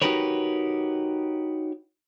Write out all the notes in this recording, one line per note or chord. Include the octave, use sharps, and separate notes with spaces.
D#4 F#4 G4 A#4 B4 C#5